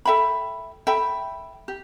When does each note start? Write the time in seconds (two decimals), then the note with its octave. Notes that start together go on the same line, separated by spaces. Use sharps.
0.05 A4 E5 G5 B5
0.87 A4 E5 G5 B5
1.68 G4